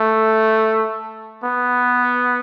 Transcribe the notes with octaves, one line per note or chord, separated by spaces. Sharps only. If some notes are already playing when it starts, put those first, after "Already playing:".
Already playing: A3
B3